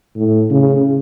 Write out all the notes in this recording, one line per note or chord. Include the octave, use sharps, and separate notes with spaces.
A2
C#3